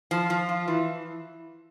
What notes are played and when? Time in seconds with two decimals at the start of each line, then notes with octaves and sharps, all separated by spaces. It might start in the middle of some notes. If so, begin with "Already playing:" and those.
0.11 F3
0.30 F3
0.49 F4
0.68 E3